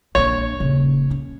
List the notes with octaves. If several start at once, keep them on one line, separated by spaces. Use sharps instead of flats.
A#1 D4 C#5
D#1 C#3
C#4